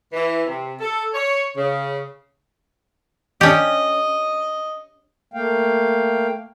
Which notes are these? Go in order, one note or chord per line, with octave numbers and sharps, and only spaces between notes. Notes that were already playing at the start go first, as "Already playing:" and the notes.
E3
C3
A4
C#5
C#3
C#4 D4 G4 D#5
A3 A#3 F5 G5